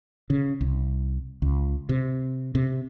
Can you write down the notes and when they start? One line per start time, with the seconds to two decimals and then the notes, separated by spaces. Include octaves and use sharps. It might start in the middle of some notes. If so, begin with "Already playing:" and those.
0.30 C#3
0.61 C2
1.42 C#2
1.89 C3
2.55 C3